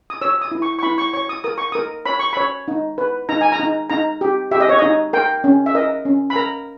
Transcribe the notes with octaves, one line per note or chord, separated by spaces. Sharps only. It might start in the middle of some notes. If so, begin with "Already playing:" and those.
D#6
C#5 E6
D#6
E4
C#6
C#6
E4 B5
C#6
C#5 C#6
D#6
A#4 D#6
C#6
A#4 D#6
C#5 B5
C#6
C#5 B5
D#4
B4
D#4 A#5
G#5
A#5
D#4
D#4 A#5
G4
G4 E5
D#5
C#5
D#4 D#5
A#4 G5
C#4
E5
A#4 D#5
C#4
B5
A#4 A#5